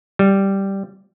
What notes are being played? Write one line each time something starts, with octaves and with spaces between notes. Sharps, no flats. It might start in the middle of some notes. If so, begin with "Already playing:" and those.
G3